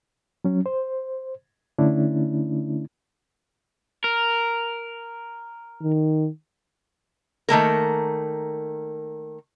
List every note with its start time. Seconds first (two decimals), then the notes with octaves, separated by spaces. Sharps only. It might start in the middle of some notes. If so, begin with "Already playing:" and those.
0.44 F#3 C#4
0.66 C5
1.78 D3 A3 C#4 D4 E4
4.04 A#4
5.82 D#3
7.49 D#3 A3 A#3 A#4